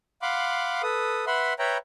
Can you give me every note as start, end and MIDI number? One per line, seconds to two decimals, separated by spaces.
0.22 0.82 77
0.22 0.82 78
0.22 0.82 83
0.22 0.82 84
0.22 0.82 86
0.83 1.25 69
0.83 1.25 71
0.83 1.25 87
1.27 1.54 71
1.27 1.54 76
1.27 1.54 78
1.27 1.54 83
1.27 1.54 84
1.59 1.78 71
1.59 1.78 73
1.59 1.78 76
1.59 1.78 79
1.59 1.78 82
1.59 1.78 83